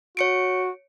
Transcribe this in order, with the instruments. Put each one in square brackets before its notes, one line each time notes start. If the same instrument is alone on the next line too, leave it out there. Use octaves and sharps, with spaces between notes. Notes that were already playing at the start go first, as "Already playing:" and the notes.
[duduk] F#4 [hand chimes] C#5 C#7 D7